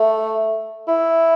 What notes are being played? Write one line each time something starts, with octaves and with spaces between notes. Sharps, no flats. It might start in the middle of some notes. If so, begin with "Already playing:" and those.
Already playing: A3
E4